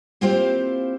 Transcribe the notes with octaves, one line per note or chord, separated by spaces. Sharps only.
A#3 C4 E4 F4 G4 C5